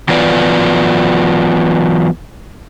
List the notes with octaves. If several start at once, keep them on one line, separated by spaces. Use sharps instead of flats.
E3 F#3 B3 F4 B4 D5